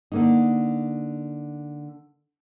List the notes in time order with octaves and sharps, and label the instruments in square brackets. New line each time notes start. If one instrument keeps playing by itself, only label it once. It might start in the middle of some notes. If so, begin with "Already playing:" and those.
[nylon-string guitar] D3 A#3 D#4